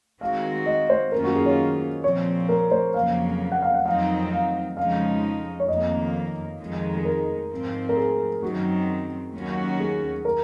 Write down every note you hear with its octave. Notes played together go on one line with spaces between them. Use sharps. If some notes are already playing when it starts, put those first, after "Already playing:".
D#3 G#3 C4 F#4 F5
D#5
C5
F#2 D#3 A#3 C#4 F4 A#4
F#4
G#4
C#5
A#2 F3 C4 C#5
A#4
C5
F2 C#3 F#3 A#3 F5
F#5
F5
F#5
F2 D#3 F#3 C4 D#4 F5
F5
F2 C#3 F3 G#3 D#4 F5
C#5
F2 D#3 A#3 D#5
F2 D#3 G#3 D#4
G#4
A#4
G#2 F3 C4
A#4
G#4
F#2 D#3 F#3 C4 F#4
D#2 D#3 F#3 C#4 F#4
G#4
A#4